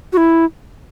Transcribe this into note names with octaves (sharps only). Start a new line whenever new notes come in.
F#4
E4